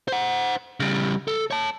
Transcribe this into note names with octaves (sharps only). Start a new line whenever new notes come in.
C5 F#5
C#3 G3
A4
C#5 A5